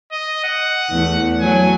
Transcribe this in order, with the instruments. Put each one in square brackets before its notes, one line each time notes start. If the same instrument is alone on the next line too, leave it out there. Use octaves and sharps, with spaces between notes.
[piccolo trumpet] D#5
F#5
[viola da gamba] E2 A3
[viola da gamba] F#3 A3 [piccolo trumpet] G#5